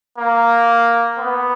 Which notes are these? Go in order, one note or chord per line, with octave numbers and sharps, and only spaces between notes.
A#3
B3